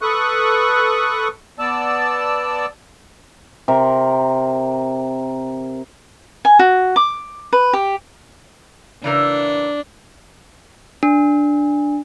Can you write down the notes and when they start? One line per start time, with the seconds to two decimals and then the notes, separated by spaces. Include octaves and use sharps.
0.02 A4 B4 C#6 D#6 F#6
1.59 B3 D5 A5 E6
3.68 C3 A#4
6.45 G#5
6.59 F#4
6.96 D6
7.53 B4
7.73 G4
9.04 C#3 E3 D4 A#4
11.03 D4